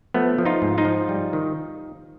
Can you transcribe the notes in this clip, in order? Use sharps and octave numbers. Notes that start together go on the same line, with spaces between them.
F3 A3 B3
F3
D#4 F4
G#2
D#4 F4
F3
G3
D#3